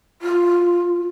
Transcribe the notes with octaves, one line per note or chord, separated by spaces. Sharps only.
F4